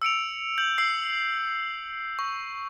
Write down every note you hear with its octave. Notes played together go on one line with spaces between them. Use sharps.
E6 C#7 D7 F7
G6 F#7
E6 C7
C#6